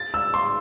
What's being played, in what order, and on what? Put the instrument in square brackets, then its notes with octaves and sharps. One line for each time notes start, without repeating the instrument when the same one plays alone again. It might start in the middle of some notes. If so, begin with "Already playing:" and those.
Already playing: [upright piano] A6
E6
C6